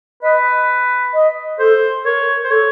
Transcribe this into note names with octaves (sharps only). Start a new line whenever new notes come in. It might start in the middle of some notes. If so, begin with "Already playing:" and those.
B4 D#5
D#5
A4 C5
A#4 C#5
C5
A4 C#5